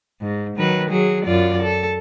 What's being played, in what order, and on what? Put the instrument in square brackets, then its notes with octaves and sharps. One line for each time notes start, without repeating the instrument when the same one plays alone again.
[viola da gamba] G#2
D#3 F#3 B4
F#3 G#4
F#2 F4 D5
A4